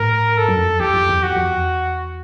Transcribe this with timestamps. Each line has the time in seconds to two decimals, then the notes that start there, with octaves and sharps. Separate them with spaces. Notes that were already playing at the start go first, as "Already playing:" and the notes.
Already playing: A2 A#4
0.38 G#2 A4
0.48 F#2
0.59 F2
0.80 E2 G4
0.94 F2
1.09 E2
1.22 F2 F#4
1.36 F2
1.51 E2